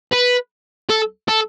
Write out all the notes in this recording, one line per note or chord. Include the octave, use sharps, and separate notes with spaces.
B4
A4
A4